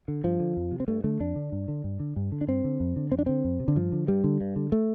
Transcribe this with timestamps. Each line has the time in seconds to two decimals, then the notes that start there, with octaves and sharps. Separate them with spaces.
0.08 D3
0.24 G2 F3
0.40 D3
0.57 F2
0.72 C3
0.80 C4
0.88 G2 A3
1.04 D3 A3
1.20 F2 D4
1.36 D3
1.52 G2
1.68 D3
1.84 G2
2.00 D3
2.16 G2
2.32 D3
2.41 D4
2.48 G2 C4
2.64 D3
2.80 F2
2.96 D3
3.12 F2 C4
3.19 D4
3.26 D3 C4
3.44 F2
3.60 C3
3.68 D3
3.75 G2 F3
3.92 D3
4.07 G2 G3
4.24 D3
4.41 G2
4.56 D3
4.72 A3